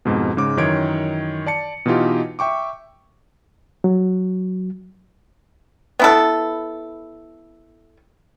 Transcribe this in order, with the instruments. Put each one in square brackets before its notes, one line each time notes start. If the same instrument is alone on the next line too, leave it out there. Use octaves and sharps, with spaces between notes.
[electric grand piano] F2 G#2 B2
G#2 C#3 D6
F#2 D#3 E3 C#5 G#6 D7
D5 A5 C#7
B2 E3 D#4 F4 G4
E5 G5 C#6 D6
[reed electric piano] F#3
[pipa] B3 E4 A4